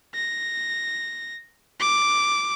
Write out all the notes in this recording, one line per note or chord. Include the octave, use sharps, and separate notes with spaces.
A#6
D6